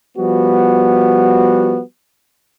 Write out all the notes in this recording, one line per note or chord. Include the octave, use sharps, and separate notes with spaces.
F3 G3 B3 F#4